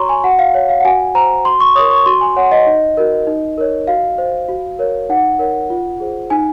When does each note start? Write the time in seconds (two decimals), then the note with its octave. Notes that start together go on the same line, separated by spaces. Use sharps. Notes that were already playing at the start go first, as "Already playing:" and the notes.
Already playing: F#4 C#5 A#5 C6 C#6
0.09 G#5
0.24 F#4 F#5
0.39 F5
0.54 C#5
0.69 F5
0.80 F#5
0.85 F#4 G#5
1.15 C5 A#5
1.45 F#4 C6
1.60 C#6
1.75 A#4 C#5 D#6
1.91 C#6
2.06 F#4 C6
2.21 G#5
2.36 C#5 F#5
2.52 D#5
2.67 D#4
2.97 F#4 A#4
3.27 D#4
3.57 A#4 C#5
3.87 F#4 F5
4.18 C5
4.48 F#4
4.79 A#4 C#5
5.09 D#4 F#5
5.39 A#4 C#5
5.70 F4
6.00 G#4 C5
6.30 D#4 G#5